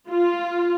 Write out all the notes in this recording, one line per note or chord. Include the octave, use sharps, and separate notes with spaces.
F4